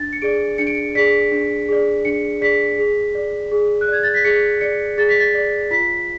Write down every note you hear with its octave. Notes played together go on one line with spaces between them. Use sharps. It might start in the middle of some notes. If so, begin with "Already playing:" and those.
Already playing: D4 A6
C#7
G#4 D5 D7
D4 C#7
D7
C#7
G#4 D5 B6
D4
G#4 D5
D4 C#7
G#4 D5 B6
G#4
D5
G#4
F#6
D5 G#6
A6
B6
G#4 C#7
D5 C#7
G#4 A6
B6
A6
D5
F4 B6